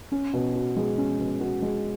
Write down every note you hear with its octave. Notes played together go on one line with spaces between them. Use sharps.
C#4
B2
F#4
G#3
C#4
B2
F#4
G#3